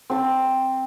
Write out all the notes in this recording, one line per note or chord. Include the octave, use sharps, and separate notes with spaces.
C4 A5